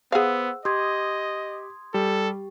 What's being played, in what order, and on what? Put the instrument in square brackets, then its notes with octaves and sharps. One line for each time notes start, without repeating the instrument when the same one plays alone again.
[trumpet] B3 [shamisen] G#4 F5 [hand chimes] C5 F#5 E6
[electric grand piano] G4 [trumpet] D#5 [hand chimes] C6 D#6 G#6
[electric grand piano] G3 [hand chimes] G4 [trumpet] A4